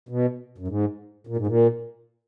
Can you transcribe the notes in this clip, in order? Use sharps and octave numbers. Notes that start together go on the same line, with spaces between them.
B2
F#2
G#2
A#2
G#2
A#2